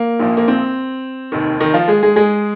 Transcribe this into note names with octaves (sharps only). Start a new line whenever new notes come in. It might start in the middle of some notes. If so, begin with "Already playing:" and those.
Already playing: A#3
A#1 A#2 F3
A#3
C4
F1 D#2 D#3
D#3 D#4
F3 F4
G#3 G#4
G#3 G#4
G#3 G#4